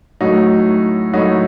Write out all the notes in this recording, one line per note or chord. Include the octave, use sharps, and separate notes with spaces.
A2 F#3 A3 D#4 F#4
A2 F#3 A3 D#4 F#4